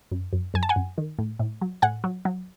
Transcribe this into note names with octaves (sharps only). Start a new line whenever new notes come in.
F#2
F#2
F#2 G#5
A5
F#5 G#5
F#2
D#3
A2
A2
F#3
A2 F#5 G#5
F#3
F#3